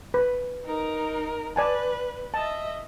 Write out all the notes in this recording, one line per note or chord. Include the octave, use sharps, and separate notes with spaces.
B4
D#4 A#4
B4 D5 G#5 A5
D#5 E5 A5